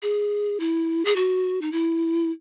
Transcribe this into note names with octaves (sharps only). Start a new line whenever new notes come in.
G#4
E4
G#4
F#4
D#4
E4